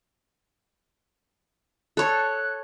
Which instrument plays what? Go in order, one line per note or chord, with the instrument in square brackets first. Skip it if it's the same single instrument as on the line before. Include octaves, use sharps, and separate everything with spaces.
[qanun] A4 C#5 [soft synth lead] F#6